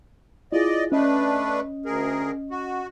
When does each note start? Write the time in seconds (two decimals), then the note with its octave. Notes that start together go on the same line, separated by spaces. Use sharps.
0.52 E4 F4 G#4 D5 D#5
0.92 A3 C#4 D4 B4 D#5
1.86 D2 G#4 A#4
2.51 F#4